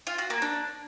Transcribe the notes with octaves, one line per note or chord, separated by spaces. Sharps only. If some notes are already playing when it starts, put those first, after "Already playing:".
F4
F#4
A#3
D4